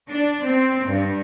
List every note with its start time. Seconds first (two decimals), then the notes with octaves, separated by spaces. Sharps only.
0.11 D4
0.44 C4
0.87 G2